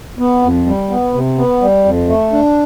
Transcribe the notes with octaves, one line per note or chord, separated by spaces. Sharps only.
B3
F2
G3
B3
C3
B3
G3
F2
A3
D4